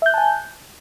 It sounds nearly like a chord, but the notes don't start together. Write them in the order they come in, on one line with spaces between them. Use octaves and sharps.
E5 G6 F#6 A5 G#5